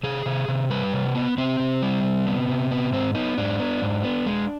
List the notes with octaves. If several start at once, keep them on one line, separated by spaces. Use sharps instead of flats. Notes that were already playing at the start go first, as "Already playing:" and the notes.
C3 G#4
C3
C3
G3 B4
C3
B3
C3 C4
C3
G3
C3
B3
C3
B3
G#2 C4
B3 D#4
G#2 D4
B3
G#2
B3
G#3